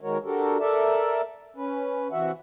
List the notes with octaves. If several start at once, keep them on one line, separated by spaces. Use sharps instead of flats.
D#3 G#3 F#4 A#4 C#5
D4 F#4 G4 A4 A#4
A4 A#4 D5 E5 A5
C#4 B4
C3 E3 F#4 E5 F#5